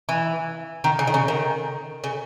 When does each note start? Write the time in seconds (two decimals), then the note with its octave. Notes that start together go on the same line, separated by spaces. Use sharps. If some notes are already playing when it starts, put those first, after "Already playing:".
0.09 E3
0.84 D#3
0.99 C#3
1.07 D#3
1.14 C#3
1.28 D#3
2.04 C#3